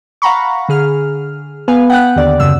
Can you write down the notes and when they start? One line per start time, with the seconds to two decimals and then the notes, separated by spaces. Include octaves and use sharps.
0.22 F5 F#5 A#5 B5 C#6
0.69 D3 G#4 F6
1.68 B3 B4 F5 G#5
1.90 F#5 G5 F#6
2.16 D#2 D3 D5
2.40 F#2 C#3 E6